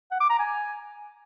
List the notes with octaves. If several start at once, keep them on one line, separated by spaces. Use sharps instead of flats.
F#5
D6
A#5
G#5